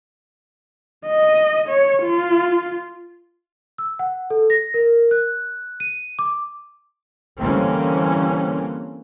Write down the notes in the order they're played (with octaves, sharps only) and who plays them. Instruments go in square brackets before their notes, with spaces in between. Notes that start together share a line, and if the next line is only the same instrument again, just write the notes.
[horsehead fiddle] D#5
C#5
F4
[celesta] E6
F#5
A4
A#6
A#4
F#6
D#7
D6
[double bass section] D3 E3 G3 A#3 C4 C#4